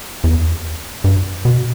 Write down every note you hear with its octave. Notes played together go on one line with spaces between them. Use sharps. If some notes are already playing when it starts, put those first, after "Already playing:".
E2
G2
B2